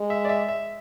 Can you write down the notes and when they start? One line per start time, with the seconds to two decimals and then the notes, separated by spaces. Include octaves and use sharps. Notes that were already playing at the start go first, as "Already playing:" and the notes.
Already playing: G#3
0.10 E5
0.25 D5
0.29 E5
0.49 E5